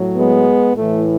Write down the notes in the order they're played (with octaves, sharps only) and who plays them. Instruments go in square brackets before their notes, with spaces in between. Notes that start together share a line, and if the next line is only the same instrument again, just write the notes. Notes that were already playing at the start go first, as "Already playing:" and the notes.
Already playing: [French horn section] A2 F#3
G#3 B3
A2 E3 A3